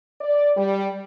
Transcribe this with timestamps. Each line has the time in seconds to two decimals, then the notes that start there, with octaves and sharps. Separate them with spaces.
0.21 D5
0.57 G3